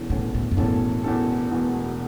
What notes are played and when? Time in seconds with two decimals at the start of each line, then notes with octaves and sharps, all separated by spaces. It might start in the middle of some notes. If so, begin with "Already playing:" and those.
Already playing: E1 E2 E3 C#4 A4
0.10 E1 E2 A2 E3 C#4 A4
0.34 A2
0.51 F#2
0.57 E1 E2 A2 E3 C#4 A4
1.04 E1 E2 E3 C#4 A4
1.51 E1 E2 B2